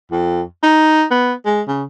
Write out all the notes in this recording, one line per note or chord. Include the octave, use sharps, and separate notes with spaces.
F2
D#4
B3
G#3
C#3